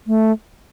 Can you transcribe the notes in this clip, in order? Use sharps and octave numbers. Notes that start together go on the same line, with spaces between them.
A3